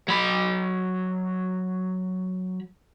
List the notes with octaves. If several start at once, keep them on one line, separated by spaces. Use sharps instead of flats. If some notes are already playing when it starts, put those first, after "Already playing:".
F#3 B5